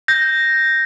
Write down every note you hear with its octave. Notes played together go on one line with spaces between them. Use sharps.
G6 A#6